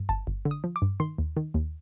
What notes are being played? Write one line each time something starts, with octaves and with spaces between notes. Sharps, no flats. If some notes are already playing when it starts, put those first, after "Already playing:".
Already playing: G2
G1 A5
G1
D3
D#6
F3
D6
G2
D#3 C6
D#2
D#3
D#2